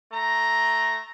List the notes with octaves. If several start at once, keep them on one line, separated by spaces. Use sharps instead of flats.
A3 A#5